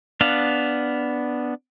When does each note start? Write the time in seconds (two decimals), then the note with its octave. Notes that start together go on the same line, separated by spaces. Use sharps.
0.21 B3 D4 F5